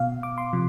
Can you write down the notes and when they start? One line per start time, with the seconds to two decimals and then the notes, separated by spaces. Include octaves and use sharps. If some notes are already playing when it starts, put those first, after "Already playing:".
Already playing: B2 F5
0.23 D6
0.38 C6
0.53 C3 F3